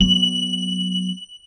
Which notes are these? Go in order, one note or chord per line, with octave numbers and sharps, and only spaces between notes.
F#3 B3 F#7